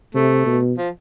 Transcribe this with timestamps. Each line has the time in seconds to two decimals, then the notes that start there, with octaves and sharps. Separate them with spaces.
0.15 C3 A3
0.46 B2
0.77 F3